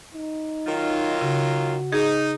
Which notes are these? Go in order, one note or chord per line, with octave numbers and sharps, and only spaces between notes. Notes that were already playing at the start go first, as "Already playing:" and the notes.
D#4
D#3 F#3 F4
C#3 F#4
D#4 G#4